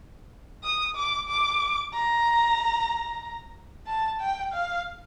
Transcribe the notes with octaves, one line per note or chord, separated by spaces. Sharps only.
D#6
D6
D6
A#5
A5
G5
F5